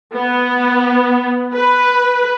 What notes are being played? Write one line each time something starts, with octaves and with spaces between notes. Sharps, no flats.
B3
B4